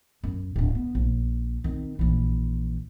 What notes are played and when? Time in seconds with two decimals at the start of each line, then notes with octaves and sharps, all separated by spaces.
0.24 F#2
0.56 D1 D4
0.75 B3
0.95 A#1
1.64 D#3 C4
1.99 A#1 E3